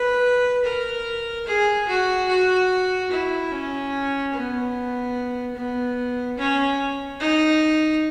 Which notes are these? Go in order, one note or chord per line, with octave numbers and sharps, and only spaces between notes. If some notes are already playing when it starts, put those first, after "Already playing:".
Already playing: B4
A#4
G#4
F#4
F#4
E4
C#4
B3
B3
C#4
D#4